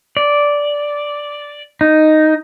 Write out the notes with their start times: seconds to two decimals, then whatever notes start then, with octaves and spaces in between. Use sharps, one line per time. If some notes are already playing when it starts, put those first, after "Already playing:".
0.17 D5
1.81 D#4